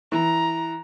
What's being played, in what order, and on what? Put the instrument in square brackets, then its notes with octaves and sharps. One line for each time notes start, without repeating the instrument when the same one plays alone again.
[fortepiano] E3 [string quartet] A#5